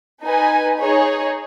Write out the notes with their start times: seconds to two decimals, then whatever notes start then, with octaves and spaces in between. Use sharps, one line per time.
0.23 D#4 B4 G#5
0.80 D#4 G#4 C#5